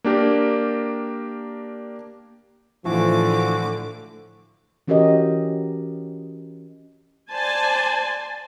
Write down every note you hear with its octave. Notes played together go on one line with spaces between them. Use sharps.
A#3 D4 G4 A#4
A2 D3 E3 F3 F#4 D6
E3 C#4 F#4 G4 A#4 D#5
C5 D5 G#5 A5